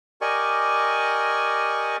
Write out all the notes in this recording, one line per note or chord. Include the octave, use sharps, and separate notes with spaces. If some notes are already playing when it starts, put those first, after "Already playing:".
G4 A#4 D5 D#5 G#5 C#6